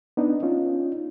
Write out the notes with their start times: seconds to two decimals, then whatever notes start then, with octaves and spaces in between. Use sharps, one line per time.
0.17 B3 D4 D#4
0.43 C#4 D#4 F4